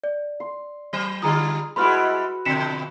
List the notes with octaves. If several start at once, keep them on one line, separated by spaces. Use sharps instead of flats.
D5
C6
F#3 C5
D3 G3 F4 G#4 A#5 D#6
G3 G#3 E4 F#4 B4 B5 C6 F6
B2 D3 F3 B6 C#7 E7